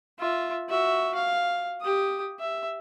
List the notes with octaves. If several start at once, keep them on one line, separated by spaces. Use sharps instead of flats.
F4 E5
F#4 E5
F5
G4 D#6
E5